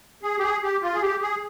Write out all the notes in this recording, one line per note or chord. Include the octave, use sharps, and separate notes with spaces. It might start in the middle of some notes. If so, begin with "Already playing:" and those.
G#4
G4
G#4
G4
F4
G#4
G4
G#4